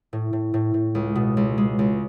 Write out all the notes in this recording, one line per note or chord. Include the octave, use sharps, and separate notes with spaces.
A2
A2
A2
A2
C#2
B2
C#2
G#3
C#2